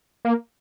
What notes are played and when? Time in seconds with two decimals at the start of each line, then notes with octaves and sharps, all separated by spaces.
0.25 A#3